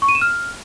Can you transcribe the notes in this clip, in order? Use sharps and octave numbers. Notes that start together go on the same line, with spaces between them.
C#6
D#7
E7
F6